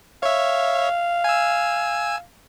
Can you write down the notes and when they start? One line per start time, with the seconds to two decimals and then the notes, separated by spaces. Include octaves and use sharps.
0.23 C#5 E5 F5
1.24 G#5 E6